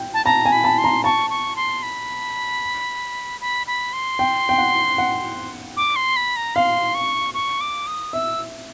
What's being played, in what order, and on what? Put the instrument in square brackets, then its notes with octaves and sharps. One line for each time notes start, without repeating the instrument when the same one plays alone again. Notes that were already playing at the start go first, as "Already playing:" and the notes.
Already playing: [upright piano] G5
[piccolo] A5
[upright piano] A5 [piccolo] A#5
[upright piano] G#5
[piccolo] B5
[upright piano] A5
[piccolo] C6
[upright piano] A#5
[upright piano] A5 [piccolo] C#6
[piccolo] C#6
C6
B5
B5
B5
C6
[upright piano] G5
G5
F#5
F#5
[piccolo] D6
C6
B5
A#5
[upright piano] F5 [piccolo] C6
[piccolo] C#6
C#6
D6
D#6
[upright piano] E5 [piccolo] E6